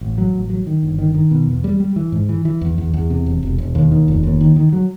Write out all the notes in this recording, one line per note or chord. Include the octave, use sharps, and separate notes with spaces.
A1
F#3
A1
F#3
D#3
G1
D#3
D#3
B2
E2
G3
G3
E3
G#2
E3
E3
E2
E2
E2
C3
E1
E1
E1
D#2
D#3
F1
D#2
D#3
D#3
F#3